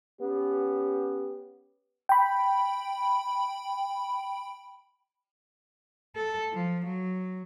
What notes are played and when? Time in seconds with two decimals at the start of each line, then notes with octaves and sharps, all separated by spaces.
0.20 B3 C#4 G4
2.09 G5 B5
6.16 A4
6.52 F3
6.85 F#3